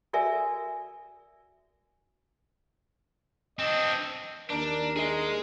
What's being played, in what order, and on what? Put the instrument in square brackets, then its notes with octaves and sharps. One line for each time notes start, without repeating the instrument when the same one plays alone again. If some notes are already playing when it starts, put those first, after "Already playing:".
[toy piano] F#4 A4 A#4 D5 E5 G#5
[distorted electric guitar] C4 D4 [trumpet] D#5
[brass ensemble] D#2 A#4 [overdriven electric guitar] D4
[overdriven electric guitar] G#4 D#5